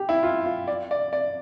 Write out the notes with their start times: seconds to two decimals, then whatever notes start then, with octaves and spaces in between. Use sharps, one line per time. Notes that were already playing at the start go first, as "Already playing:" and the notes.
Already playing: G4
0.09 E4
0.23 F4
0.45 F4
0.67 D5
0.91 D5
1.13 D5